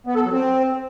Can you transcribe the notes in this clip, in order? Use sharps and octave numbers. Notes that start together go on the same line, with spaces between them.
B3
A4
F#3
C4